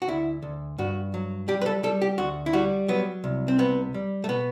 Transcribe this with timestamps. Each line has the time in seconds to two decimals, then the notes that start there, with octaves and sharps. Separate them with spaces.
0.02 F#4
0.08 D2 E4
0.42 D2
0.78 G2 F#4
1.14 F#3
1.48 G3 G4
1.62 B4
1.66 A4
1.83 G3 A4
2.02 G4
2.18 D2 F#4
2.46 E4
2.53 G3 F#4
2.88 F#3 B3
3.24 C2
3.48 C4
3.58 C3 B3
3.94 G3
4.24 A3
4.29 B2 B3